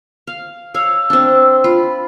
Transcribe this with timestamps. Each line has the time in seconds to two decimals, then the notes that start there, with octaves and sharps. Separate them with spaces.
0.27 F5
0.74 C#5 F5 E6
1.10 C4 D4
1.64 F4 B5